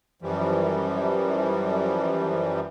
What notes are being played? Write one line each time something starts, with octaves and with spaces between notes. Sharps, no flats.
F#2 E3 F3 G3